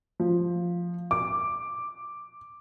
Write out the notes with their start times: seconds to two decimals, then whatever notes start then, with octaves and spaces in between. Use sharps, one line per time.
0.20 F3
1.11 D6